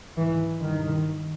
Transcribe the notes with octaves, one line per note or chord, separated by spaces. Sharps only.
G#2 E3
G2 D#3